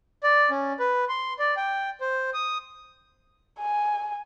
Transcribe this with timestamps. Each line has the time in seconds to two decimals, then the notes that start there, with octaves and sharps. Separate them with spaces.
0.23 D5
0.50 C#4
0.79 B4
1.09 C6
1.39 D5
1.56 G5
2.01 C5
2.34 D#6
3.59 G#5